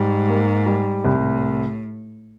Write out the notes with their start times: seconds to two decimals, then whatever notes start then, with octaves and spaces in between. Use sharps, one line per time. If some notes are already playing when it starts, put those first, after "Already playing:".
Already playing: G#2 G3
0.29 A#3
0.66 G3
1.04 C2 A2